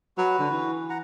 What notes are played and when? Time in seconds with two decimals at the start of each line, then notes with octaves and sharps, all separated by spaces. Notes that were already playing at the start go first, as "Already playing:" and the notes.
0.18 F#3 F#4 B4
0.39 D3
0.51 E3
0.90 F#5 A#5